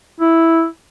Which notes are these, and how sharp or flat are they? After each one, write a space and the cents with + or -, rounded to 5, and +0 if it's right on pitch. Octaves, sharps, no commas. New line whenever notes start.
E4 -5